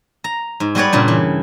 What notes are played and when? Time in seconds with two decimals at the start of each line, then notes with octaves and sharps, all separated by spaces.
0.24 A#5
0.60 G#2
0.75 G3 F#4 G#4 B4 C#5 D5
0.93 G2 A#2 C#3
1.08 E3